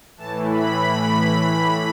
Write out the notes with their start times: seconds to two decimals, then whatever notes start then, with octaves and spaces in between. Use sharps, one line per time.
0.18 A2 E3 A5
0.50 B5